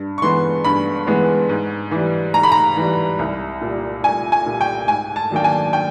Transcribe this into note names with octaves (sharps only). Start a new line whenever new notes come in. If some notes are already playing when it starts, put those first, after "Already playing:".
Already playing: G2
C#6
E3 G#3 B3 C6
G2 B5
E3 G#3 B3
G#2
E3 G3
G#2 A#5
B5
A#5
E3 G3
C2
A#2 G3
C2 G#5
G#5
A#2 G3
G5
G#2 G#5
A5
D#3 F#3 A#3 D4 G5
G#5
G5